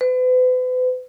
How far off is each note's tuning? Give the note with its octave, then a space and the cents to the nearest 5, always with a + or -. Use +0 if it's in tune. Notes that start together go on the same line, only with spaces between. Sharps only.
B4 +40